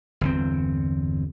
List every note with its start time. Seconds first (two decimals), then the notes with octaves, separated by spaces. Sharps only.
0.21 G1 E2 C4